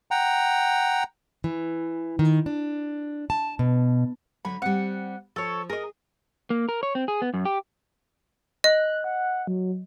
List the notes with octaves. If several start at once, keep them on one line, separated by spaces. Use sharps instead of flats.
F#5 G5 A#5
E3
D#3
D4
A5
B2
D3 F#3 C#5 B5
G3 C4 F#5
F3 A4 C#5
G#4 A#4 D#5
A#3
A#4
C#5
C4
G#4
B3
F#2
G4
D#5 F#6
F#5
F#3